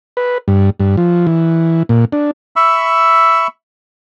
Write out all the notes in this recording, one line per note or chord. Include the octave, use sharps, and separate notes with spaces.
B4
G2
G2
F3
E3
A#2
D4
E5 B5 C#6 E6